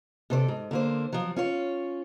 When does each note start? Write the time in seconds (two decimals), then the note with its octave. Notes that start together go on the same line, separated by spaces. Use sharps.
0.30 C3 A4 C5 D5
0.48 G#2
0.71 D3 A#3 C5
1.13 F3 F#3
1.36 C#4 F4 C#5